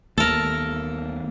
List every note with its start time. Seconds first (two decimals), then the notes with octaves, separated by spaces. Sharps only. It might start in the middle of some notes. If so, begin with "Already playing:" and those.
0.18 D#2 A3 B3 A4 A#4